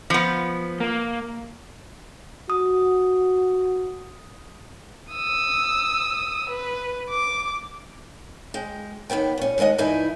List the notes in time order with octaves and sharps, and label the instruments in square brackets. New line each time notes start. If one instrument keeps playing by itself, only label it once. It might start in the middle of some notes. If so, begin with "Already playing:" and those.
[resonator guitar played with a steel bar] F3 B3
[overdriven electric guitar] A#3
[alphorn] F#4 [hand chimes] D#6
[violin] D#6 E6
B4
D6
[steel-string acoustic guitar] G#3 G5
D#2 G#2 B3 G5
A#2 C#4
D#2 G#3 A4 D#5 F#5
G2 E3 D#4 E4 G#5